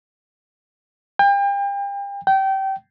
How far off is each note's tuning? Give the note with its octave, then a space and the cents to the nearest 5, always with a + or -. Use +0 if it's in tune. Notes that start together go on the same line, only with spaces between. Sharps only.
G5 +35
G5 -25